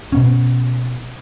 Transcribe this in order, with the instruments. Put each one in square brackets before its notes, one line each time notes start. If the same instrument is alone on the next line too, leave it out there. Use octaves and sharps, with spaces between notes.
[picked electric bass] B2 B3 C#4